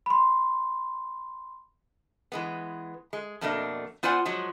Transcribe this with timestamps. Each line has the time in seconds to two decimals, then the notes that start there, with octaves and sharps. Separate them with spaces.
0.06 B5 C6
2.32 E3 G#3 B3
3.13 G#3
3.41 F2 B2 A3 A#3 D4 D#5
4.03 B3 F4 C5 D5 F#5 G#5
4.25 F3 F#3 G#3